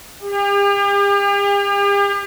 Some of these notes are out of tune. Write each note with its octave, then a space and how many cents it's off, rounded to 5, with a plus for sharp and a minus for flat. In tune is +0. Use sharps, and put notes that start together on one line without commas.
G4 +40